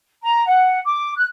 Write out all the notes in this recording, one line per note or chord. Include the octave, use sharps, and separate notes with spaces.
A#5
F#5
D6
F#6